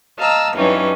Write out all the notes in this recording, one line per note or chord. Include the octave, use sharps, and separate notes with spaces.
D#5 F5 A5 A#5 E6
G2 E3 F#3 C#4 D#4